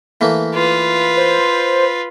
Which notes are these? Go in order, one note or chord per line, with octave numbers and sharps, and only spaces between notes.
E3 A3 A#3
F4 B4
C5